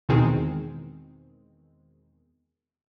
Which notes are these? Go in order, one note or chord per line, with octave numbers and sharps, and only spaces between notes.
E2 B2 D#3 G#3 C4